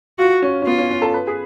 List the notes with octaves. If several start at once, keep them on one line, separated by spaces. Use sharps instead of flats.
F4 F#4
C#4
C#4
B3 F4
C#4
C#4
A4
B4
G#4